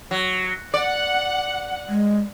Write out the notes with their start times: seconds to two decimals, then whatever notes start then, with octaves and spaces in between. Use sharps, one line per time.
0.11 F#3
0.74 D5 F#5
1.89 G#3